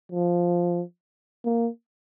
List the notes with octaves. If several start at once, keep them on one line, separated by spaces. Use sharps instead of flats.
F3
A#3